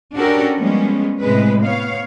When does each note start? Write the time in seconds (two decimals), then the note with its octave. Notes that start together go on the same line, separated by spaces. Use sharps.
0.14 C#4 D4 F#4 G4 A4 A#4
0.58 F3 G3 G#3 A#3 B3 C#4
1.22 A2 C3 G#3 B4
1.63 B3 C#5 F5